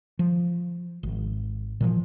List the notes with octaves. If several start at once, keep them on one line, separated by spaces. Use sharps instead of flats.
F3
G#1
A#2 E3 F3